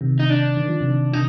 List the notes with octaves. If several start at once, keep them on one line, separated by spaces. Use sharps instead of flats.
C3 D#3
D#4
D4
D#3
F3
C3 D#3
C3 D#3 D#4